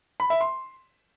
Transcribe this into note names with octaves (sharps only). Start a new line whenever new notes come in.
B5
E5
C6